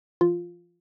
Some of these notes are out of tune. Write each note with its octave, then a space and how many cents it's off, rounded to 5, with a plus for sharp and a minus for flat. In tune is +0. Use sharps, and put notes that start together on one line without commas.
F3 -40 F4 +0